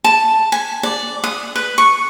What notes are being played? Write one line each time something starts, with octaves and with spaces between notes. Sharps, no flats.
A5
G#5
D5
D#6
B4
C#6